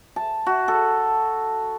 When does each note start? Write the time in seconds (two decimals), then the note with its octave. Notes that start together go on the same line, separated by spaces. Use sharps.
0.16 A5
0.47 F#4
0.68 A4